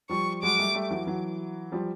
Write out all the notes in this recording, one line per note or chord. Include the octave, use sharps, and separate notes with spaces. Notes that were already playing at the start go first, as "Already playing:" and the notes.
F3 G3 C#6
F#3 G#3 D6
G3 A3
G3 A3
E3 F#3
E3 F#3
F3 G3